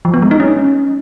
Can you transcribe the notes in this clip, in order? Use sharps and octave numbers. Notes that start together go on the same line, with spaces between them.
F3
B3
G#3
D#4
C#4